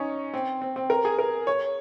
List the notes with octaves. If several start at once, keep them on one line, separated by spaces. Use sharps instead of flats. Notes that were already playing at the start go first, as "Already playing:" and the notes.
Already playing: C#4 D#4
C4
C4
C4
A#4
G#4
A#4
C#5